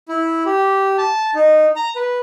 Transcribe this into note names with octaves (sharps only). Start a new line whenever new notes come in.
E4
G4
A5
D#4
A#5
B4